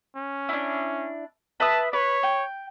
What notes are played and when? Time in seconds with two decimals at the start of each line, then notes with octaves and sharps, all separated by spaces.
0.16 C#4
0.49 D4 E4
1.60 B4 E5 A5 D#6
1.93 B4 C#5
2.23 G5